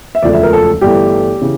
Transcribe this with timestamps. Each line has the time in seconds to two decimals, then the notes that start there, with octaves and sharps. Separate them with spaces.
0.15 E5
0.23 E1 D2 C#3 F3 A3 D5
0.33 E5
0.43 A#4
0.53 A4
0.81 G1 G2 E3 A3 G4
1.41 C#3 E3